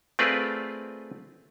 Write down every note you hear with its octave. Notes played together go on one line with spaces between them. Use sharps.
A3 C4 F4 G#4 B4 D5